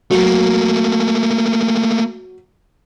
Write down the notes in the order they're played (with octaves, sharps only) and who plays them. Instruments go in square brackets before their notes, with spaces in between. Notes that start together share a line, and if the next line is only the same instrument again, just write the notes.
[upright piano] F#3 [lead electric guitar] A3 A#3